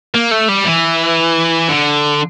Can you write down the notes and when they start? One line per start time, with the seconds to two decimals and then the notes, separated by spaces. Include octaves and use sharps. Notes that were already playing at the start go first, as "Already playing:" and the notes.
0.15 A#3
0.31 A3
0.49 G3
0.65 E3
1.68 D3